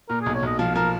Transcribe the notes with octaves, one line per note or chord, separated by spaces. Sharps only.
A#2 A#4
B1 G#4
C#5
B1 D#5
F3 F5
F3 A#4